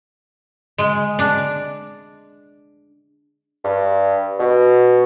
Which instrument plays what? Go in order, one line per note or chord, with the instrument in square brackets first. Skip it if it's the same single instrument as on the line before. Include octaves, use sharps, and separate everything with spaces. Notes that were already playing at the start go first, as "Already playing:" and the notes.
[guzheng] G#3
D4
[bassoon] G2
B2